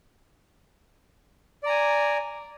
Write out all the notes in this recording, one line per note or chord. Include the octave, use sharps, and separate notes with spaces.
D5 G#5 A#5